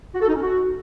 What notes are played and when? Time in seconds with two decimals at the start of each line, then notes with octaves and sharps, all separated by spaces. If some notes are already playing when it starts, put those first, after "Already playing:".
0.14 F#4
0.21 A4
0.28 D#4
0.34 C#4
0.41 F#4